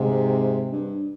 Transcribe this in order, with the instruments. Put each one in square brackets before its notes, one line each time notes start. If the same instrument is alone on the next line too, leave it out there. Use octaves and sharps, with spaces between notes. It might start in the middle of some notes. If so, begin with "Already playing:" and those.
Already playing: [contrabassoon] G#2 [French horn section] C3
[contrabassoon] G2